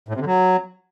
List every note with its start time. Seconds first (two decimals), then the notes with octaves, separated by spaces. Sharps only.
0.08 A2
0.14 C3
0.20 D3
0.26 F#3